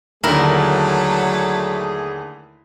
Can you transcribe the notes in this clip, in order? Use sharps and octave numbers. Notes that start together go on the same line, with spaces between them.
D#2 D3 F#3 A3 E4 G#4 A#4